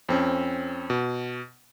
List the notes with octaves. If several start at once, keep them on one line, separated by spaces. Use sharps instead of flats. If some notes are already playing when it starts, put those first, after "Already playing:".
F2 C4 C#4
B2